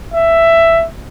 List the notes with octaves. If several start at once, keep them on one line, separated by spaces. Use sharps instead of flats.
E5